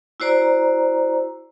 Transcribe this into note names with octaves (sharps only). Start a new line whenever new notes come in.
E4 F#4 C5 D5 A#5